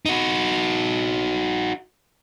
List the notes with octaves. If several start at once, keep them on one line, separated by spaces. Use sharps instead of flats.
D#4 F#4